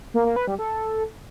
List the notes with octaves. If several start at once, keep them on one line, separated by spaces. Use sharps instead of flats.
A#3
A#3
B4
G3
A4